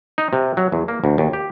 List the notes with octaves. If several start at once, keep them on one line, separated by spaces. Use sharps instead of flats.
D#4
C3
F#3
E2
A#3
D2
D#2
G4